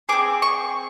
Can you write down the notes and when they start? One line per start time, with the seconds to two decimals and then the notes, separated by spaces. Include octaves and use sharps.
0.09 C4 D#4 G#4 D6
0.42 C#6